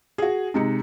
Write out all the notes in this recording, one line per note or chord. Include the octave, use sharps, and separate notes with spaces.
F#4 G#4
C3 G#3 D#4 C#7